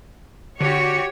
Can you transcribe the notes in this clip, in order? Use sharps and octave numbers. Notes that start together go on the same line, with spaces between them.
D3 F#4 G4 C#5